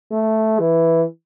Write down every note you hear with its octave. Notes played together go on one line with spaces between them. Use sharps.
A3
E3